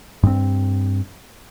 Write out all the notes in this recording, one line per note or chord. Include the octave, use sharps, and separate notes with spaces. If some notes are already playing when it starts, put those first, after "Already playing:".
G2 C4